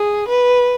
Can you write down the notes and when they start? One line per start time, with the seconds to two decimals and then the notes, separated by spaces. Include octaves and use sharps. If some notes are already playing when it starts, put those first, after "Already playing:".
Already playing: G#4
0.28 B4